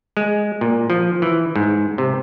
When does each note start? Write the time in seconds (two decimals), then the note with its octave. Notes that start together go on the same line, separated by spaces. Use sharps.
0.17 G#3
0.61 A#2
0.90 F3
1.22 E3
1.56 G#2
1.98 C3